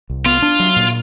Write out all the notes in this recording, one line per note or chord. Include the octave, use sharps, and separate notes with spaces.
C2
B3 F4
D4
F#3
A#2